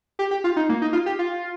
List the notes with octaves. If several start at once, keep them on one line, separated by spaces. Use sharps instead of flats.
G4
G4
F4
D#4
A#3
D#4
F4
G4
F4